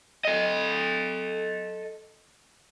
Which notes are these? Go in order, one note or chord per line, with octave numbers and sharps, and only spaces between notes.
A4 D#5